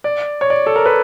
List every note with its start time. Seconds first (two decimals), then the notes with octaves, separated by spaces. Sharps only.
0.04 D5
0.41 C#5
0.50 D5
0.66 A4
0.76 A#4
0.86 B4